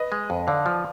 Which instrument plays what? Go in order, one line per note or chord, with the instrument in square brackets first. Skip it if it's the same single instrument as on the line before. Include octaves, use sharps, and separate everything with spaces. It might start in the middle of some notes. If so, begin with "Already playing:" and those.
Already playing: [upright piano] B4 D#5
[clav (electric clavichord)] G#3
F2
[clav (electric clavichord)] D3 [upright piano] D5 F5
[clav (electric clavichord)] F3